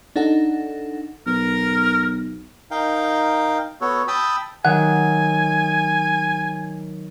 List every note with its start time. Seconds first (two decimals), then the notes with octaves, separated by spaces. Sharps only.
0.16 D4 D#4 A4 F#5
1.27 B1 A#4
2.71 D#4 A#4 F5 G5
3.81 B3 F#4 A4 C#5
4.08 G5 A5 B5 D#6 E6
4.65 D#3 F#3 F#5 G#5